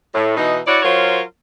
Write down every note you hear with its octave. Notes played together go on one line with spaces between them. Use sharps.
A2
B2 E3 D#4
E4 F#4 C#5 D5
F#3 F4 A#4 C5 C#5